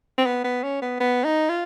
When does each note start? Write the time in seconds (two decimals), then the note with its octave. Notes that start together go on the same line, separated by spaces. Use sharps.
0.18 C4
0.26 B3
0.44 B3
0.63 C#4
0.82 B3
1.00 B3
1.24 D#4
1.49 F4